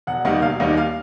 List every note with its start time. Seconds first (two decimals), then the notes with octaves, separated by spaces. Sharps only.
0.07 E1 F#5
0.25 D#2 D#3 G3 F#5
0.42 E1 F5
0.60 D#2 D#3 G3
0.77 F5